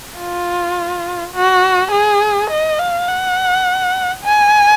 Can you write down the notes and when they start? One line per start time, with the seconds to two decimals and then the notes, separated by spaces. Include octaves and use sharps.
0.19 F4
1.35 F#4
1.92 G#4
2.50 D#5
2.79 F5
3.08 F#5
4.24 G#5